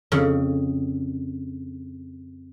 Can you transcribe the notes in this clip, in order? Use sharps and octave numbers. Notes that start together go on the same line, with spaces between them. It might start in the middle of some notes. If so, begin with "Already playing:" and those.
F2 C#3